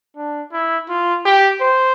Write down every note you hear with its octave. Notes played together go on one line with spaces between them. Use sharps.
D4
E4
F4
G4
C5